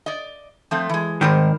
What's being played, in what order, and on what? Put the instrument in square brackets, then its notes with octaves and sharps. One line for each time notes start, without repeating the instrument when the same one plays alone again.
[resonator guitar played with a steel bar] D5 D#5
F3 A3 C4
E3 G#3
[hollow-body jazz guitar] G#2 D#3 [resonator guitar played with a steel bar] G3 A#4 C5